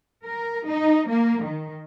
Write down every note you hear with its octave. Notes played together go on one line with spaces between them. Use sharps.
A#4
D#4
A#3
D#3